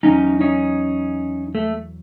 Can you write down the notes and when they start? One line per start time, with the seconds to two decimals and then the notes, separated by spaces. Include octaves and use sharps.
0.03 E2 C#3 F#3 C#4 D#4
0.41 C#4 D#4
1.55 A3